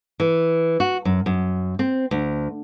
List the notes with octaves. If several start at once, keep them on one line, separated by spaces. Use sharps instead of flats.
E3
F#4
F#2
F#2
C4
D2